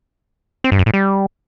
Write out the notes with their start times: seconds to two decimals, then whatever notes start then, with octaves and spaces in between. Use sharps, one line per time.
0.64 C4
0.72 G2
0.79 F#2
0.86 A2
0.94 G3